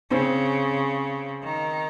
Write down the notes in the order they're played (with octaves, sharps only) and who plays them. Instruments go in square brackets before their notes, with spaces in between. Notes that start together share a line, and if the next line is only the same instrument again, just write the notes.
[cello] C#3 [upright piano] C4
[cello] D#3